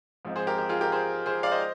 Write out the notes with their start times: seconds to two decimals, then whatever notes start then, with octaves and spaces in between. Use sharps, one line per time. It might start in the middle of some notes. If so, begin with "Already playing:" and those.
0.25 G#2 F3 C4 D#4
0.36 G#4 C5
0.47 G4 A#4
0.58 G4
0.69 F4 G#4
0.81 G4 A#4
0.92 G#4 C5
1.26 G#4 C5
1.43 D5 F5
1.52 C5 D#5